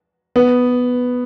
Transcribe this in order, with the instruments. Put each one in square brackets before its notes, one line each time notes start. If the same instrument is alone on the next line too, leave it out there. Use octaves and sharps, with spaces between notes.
[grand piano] B3